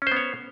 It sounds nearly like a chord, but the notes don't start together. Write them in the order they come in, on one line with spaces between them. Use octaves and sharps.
C#4 C5 B3 C#5